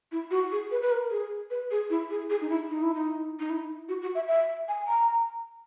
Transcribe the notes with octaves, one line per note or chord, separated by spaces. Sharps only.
E4
F#4
G#4
B4
B4
A#4
G#4
B4
G#4
E4
G#4
G#4
D#4
E4
D#4
E4
D#4
D#4
E4
F#4
F#4
E5
E5
G#5
A#5